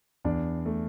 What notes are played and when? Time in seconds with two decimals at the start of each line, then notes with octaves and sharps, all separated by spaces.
0.25 E2 D4
0.66 A3